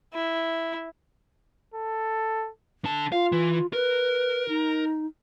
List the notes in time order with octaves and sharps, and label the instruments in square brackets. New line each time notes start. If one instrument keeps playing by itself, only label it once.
[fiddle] E4
[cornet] A4
[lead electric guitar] D3 A5
[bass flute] F4 [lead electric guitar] F5
[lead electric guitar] E3
[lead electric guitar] A#4 [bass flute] B4
[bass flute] D#4